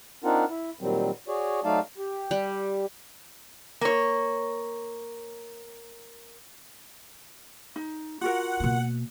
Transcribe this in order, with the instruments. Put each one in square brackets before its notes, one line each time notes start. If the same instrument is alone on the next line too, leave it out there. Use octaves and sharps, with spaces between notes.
[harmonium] C4 D4 D#4 F4 A#4 F#5
E4
A#2 D#3 F#3 G3 C4
F#4 G#4 C#5 D5
F#3 A3 D#4 D5 F5 A5
G4
[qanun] G3
[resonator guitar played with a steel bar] A#3 C#5
[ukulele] D#4
[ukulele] F4 F#4 A#4 [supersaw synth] F#5
[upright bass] B2 A#3